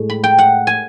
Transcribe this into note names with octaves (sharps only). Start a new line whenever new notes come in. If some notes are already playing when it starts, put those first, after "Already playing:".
Already playing: A2 G#3
B5
G5
F#5
G#5